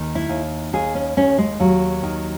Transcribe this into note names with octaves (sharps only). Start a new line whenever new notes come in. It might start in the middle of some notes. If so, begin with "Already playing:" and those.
Already playing: D#2 D#3
E4
D#2
D#2 G#4
C#4
D#2 C#4
G#3
D#2 F#3
D#3